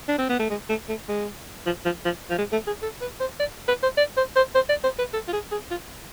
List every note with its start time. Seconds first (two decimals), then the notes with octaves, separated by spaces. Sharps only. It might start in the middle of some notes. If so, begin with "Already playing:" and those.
0.08 D4
0.18 C4
0.29 B3
0.39 A3
0.50 G#3
0.69 A3
0.89 A3
1.08 G#3
1.66 F3
1.85 F3
2.05 F3
2.30 F3
2.38 G#3
2.52 A3
2.67 G#4
2.82 A4
3.01 B4
3.20 C5
3.40 D5
3.68 B4
3.83 C5
3.97 D5
4.17 C5
4.36 C5
4.55 C5
4.69 D5
4.84 C5
4.99 B4
5.13 A4
5.28 F4
5.33 G#4
5.52 G#4
5.71 F4